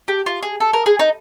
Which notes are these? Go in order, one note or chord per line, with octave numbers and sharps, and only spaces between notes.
G4
F4
G#4
A4
A#4
G#4
D#4